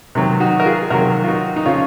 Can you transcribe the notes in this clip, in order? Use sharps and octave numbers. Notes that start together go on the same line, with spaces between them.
C3 D#3 F#3
D#4 F#4
A#4
F4 G#4
C3 D#3 F#3 F#4 A#4
F4
D#4 F#4
D#4
C#3 F3 C#4 F4